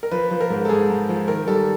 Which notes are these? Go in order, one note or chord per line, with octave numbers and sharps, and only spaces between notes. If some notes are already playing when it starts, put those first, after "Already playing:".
A#4
F3 B4
F3 B4
A#4
G#2
A4
G#2 G#4
G#2
F3
D#3 A#4
G3 A4